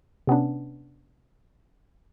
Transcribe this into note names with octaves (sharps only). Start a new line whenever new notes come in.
C3 B3 C#4 D4